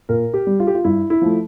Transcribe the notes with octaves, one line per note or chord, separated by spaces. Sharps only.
A#2 A#4
G4
G3
F4
G4
F4
G2 E4
E4
F3 A3